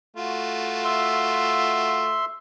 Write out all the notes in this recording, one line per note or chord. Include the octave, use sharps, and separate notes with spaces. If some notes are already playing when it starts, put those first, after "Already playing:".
A3 F4 F#4
E5 C6